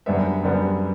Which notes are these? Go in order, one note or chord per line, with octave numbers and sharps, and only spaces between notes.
F#2 D3 G3 B3 E5
F#2 D3 G3 B3